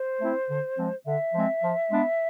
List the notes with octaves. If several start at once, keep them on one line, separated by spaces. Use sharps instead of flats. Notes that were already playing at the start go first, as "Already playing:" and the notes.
Already playing: C5
A3 C4 E4
D3
F3 G#3 C4
D3 E5
F3 G#3 C4
F3
G#3 B3 D4